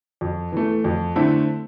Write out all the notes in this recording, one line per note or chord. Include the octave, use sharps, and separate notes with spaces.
F2
E3 A3
F2
D3 A3 C4 E4